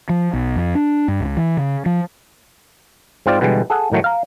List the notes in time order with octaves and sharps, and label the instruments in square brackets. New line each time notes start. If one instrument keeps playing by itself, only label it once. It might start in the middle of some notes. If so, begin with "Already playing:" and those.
[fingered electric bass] F3
B1
F2
D4
G2
C#2
E3
C#3
F3
[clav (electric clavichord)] G#2 C4 F4 D5
B2 D3 E3 G3 G#3
G#4 A4 F#5
A2 D#3 F#3 A3
F5 A#5